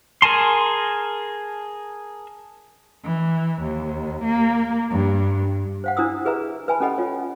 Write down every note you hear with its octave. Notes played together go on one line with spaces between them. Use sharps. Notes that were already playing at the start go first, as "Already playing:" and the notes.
G#4 A#4 G#5 A5 C6
E3
D#2
A#3
G2
C5 F5 F#5
D4 E4 C5 D#6 E6
G4 G#4 B4 E5 A#5
B4 E5 G#5 A5 B5
C#4 G4 A4 D#5 F#5 B5
F4 C#5